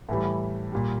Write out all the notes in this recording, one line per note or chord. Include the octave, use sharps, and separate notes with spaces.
A2 E3 G3
A#2 G3